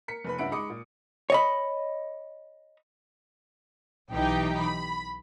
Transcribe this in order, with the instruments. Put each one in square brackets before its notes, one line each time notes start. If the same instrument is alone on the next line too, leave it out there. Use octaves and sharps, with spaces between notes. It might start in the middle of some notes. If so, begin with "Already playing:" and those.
[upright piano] A#4 B6 C#7
F1 B4 B5
C#2 G2 E5 F#5 B5 D7
G#3 D#4 B5 D6 D#6 C#7
A#2
[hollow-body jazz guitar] C#5 D#5 B5
[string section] B1 E3 D#4 G4 G5
B5